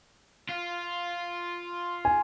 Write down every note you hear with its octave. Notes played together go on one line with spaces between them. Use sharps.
F4
G#5